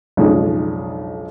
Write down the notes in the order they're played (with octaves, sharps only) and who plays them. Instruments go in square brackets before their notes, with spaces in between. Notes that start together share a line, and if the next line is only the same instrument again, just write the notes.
[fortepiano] B1 F2 C#3 G#3 D4 D#4